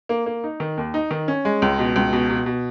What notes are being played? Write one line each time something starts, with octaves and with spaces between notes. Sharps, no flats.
A#3
A#3
D#4
D#3
D#2
D#4
D#3
C#4
G#3
C#2
B2
C#2
B2
B2
B2